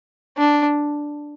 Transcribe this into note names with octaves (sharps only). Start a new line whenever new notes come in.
D4